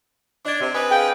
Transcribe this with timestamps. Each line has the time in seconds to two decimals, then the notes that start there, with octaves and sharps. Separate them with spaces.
0.45 D4 D#5 G#6
0.61 C3
0.74 C4 D4 B4 D#5 G#5 D#6
0.91 G#4 F5 G5 G#5